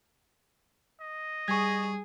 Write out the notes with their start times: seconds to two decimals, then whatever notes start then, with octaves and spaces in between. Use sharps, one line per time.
1.00 D#5
1.48 G3 G#4 C#6 G#6